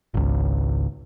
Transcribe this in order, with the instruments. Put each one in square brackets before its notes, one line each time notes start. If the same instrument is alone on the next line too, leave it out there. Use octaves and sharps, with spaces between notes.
[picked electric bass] G#1 C#2